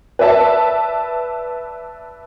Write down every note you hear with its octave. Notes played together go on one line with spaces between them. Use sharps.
B4 D5 E5 A5